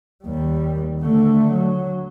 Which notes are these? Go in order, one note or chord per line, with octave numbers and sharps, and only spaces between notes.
D#2 G3
D3 A3
F#3